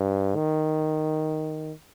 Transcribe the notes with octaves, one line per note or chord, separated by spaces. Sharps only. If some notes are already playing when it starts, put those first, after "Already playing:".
Already playing: G2
D#3